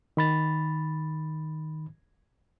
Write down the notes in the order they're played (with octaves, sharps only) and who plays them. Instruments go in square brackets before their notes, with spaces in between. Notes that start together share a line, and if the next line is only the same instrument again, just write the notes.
[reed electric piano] D#3 B5 A6